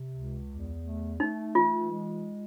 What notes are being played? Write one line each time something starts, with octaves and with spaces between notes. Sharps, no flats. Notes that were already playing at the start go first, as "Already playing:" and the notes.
Already playing: C3
C#2
E2
A3
A3 D#4
E3 F4
G#3